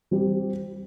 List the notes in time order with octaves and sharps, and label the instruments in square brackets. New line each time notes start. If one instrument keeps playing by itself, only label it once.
[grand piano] G3 C4 G4